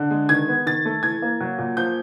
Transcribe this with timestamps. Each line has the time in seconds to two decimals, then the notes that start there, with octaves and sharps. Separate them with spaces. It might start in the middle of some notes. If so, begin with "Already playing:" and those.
Already playing: D3
0.11 G#3
0.29 D#3 G#6
0.48 B3
0.66 D#3 A6
0.85 A3
1.03 E3 G#6
1.22 A#3
1.41 F#3
1.58 A#2
1.77 F3 G6